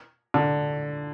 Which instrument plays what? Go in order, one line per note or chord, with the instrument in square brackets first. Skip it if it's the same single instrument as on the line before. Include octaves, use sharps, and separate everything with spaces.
[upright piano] D3